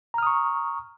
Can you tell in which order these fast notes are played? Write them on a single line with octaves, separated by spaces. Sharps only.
A#5 F6 D#6 C#6